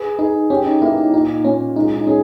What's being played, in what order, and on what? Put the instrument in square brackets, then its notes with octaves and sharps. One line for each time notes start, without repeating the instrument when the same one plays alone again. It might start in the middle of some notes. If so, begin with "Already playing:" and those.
Already playing: [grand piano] G#4 [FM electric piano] B4
[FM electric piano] D#4 [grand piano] G#4
[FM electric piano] C#4 [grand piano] G4
[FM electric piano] D#4
[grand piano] A#3 [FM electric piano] E4
[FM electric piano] D#4
[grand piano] A#2 [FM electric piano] D#4
[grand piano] A#2 [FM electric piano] C#4
[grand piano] G#3 [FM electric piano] D#4
[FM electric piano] D#4
[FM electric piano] C#4 [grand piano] G#4